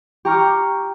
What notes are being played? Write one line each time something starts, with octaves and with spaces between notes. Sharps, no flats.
G4 G5 A#5 C#6 D6 F6